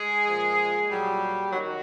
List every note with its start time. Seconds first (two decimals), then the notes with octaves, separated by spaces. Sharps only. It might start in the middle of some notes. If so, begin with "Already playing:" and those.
Already playing: G#3 G#4
0.27 A#2 F3
0.90 A#2 F#3 G3 G4
1.52 F#2 D#3 F#3 F#4